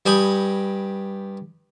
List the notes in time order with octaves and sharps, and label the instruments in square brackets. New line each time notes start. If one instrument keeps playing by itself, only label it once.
[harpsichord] G2 G4 G#5 B5 D#6